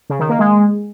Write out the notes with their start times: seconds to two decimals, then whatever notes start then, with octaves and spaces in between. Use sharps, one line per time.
0.10 C#3
0.19 D#3
0.29 A#3
0.39 G#3